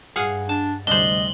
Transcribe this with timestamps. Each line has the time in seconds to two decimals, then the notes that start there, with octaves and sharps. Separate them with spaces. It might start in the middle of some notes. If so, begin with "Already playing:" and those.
0.16 G2 G#4 F5 F#5
0.49 D4 A5
0.87 D2 C3 G3 D4 C5 D#5 F#7 G7